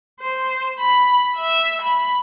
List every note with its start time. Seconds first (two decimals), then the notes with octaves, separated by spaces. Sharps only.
0.21 C5
0.79 B5
1.35 E5
1.82 B5